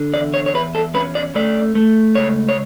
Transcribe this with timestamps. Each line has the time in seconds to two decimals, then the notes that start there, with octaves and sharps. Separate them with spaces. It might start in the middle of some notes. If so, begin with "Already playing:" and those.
Already playing: D3
0.14 E2 D5
0.34 C#5
0.46 C#5
0.54 E2 B4
0.75 A4
0.95 C#4 B4
1.15 D5
1.35 A3 D5
1.75 A3
2.15 C#2 C#5
2.49 C#5